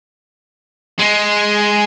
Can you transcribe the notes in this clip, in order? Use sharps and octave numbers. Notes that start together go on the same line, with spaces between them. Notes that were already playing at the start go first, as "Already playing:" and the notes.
G#3